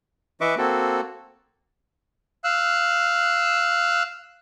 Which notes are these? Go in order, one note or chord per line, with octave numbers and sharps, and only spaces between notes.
E3 B4 D#5 E5 C#6 D6
A#3 C4 F#4 A4
F5 E6 F#6